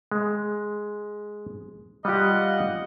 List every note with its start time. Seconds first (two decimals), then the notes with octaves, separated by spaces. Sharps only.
0.11 G#3
2.05 G3 F4 G4 D#5 F#5